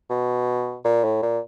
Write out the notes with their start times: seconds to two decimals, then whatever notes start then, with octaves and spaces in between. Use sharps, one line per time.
0.10 B2
0.84 A#2
1.04 A2
1.22 A#2